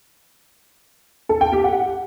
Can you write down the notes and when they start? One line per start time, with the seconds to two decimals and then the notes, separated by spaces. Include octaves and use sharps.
1.29 A4
1.41 G5
1.52 G4
1.64 F#5